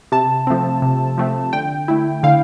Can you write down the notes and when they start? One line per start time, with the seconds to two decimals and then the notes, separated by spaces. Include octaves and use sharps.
0.12 C3 A5
0.47 F3 A3 C4
0.82 C3
1.18 F3 A3 C4
1.53 D3 G5
1.88 A3 E4
2.23 D3 F5